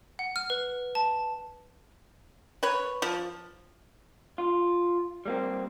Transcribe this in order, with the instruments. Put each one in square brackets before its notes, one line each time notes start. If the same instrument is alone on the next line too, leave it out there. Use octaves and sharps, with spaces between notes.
[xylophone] F#5
F6
B4
A5
[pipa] B4 C#5
F3
[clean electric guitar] F4
G3 A#3 C4